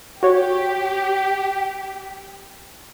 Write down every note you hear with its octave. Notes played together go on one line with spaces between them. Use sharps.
F#4 G4 C#5